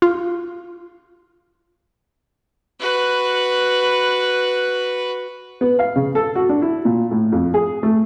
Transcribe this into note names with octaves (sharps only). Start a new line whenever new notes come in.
F4
F#4 B4
B3
F5
C#3
A4
F#4
D4
E4
A#2
A2
F2
G#4
A3